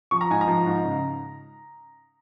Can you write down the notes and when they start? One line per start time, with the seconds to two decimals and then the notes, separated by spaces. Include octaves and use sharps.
0.11 F3 C#6
0.21 A#5
0.30 G#2 G#5
0.41 A#5
0.47 F3
0.66 G#2
0.84 C#3